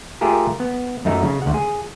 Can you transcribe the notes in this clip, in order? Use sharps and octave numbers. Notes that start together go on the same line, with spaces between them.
A3 F4 G4 G#4 A#4
B3
F#2 A3 D#4 F#5 A#5
C#3
D2 F#5
G#4